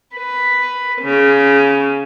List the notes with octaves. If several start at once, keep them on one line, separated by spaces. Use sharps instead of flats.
B4
C#3